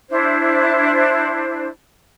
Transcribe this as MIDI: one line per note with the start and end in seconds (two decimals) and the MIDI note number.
0.09 1.67 62
0.09 1.67 64
0.09 1.67 72